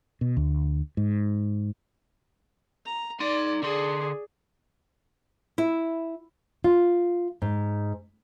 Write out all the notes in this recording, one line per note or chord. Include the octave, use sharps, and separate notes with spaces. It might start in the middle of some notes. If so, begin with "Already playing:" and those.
B2
D2
G#2
A#5
D#4 D5 C6
D3 G#4 D5 C6
E4
F4
G#2